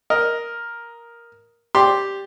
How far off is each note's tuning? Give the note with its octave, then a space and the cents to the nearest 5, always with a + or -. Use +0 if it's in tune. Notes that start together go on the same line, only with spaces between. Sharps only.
A#4 +5 D#5 +5
G4 +0 D5 +0 C6 +0